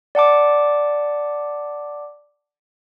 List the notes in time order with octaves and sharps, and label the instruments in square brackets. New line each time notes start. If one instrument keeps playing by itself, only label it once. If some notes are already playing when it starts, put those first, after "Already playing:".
[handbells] D5 F#5 A5 D6